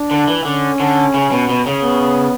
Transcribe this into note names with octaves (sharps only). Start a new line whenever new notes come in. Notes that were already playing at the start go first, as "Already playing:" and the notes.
Already playing: D4
D3
E3
D3 C#4
D3
C#3
B2
B2
C#3
B3